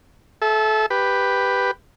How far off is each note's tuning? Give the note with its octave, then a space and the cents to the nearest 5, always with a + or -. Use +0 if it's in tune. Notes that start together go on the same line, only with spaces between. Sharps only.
A4 -30 E5 +0
G4 +5 B4 +0